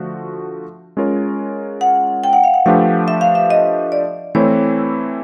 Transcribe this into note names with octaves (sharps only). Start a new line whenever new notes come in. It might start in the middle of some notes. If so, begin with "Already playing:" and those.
Already playing: D3 F3 A3 F#4
G#3 C#4 F4 A#4 C#5
F#5
G5
F#5
F5
F#5
F3 A3 D4 G4 B4 F5
E5
F5
E5
D#5
D5
E3 A3 C4 E4 C#5